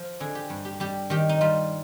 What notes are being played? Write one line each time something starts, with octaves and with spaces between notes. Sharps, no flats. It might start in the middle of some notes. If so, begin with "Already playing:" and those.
Already playing: F3
D3 G#4
G4
G2
G4
G3 G4
D#3 G4
D#4
G3 F4